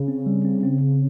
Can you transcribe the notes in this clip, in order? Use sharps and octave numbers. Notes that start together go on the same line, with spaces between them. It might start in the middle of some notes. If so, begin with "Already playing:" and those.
Already playing: C#3
C4
G3
C4
C4
C4